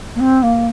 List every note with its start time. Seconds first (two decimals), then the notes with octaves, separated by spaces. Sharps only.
0.16 A#3
0.20 C4
0.43 A#3